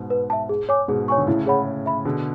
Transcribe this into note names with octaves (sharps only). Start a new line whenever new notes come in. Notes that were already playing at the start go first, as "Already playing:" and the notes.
Already playing: G#2 B2
B4
E5 A5
G#4
C#5 G#5 D6
G#2 B2 G#4
C#5 G#5 C#6
D3
A2 C#3 E4
G#4 C#5 F#5 B5
C#5
E5 B5
B2 D3 G#4